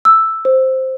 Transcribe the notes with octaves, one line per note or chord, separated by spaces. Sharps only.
E6
C5